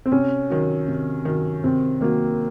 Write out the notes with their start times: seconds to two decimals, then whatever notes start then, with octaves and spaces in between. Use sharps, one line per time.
0.06 C4
0.12 C3 C#4
0.50 D#3 F#3
0.88 C3
1.25 D#3 F#3
1.64 C3 C4
2.01 D#3 F#3 A#3